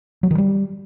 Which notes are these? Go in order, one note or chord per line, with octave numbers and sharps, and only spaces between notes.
F#3
D#3
G3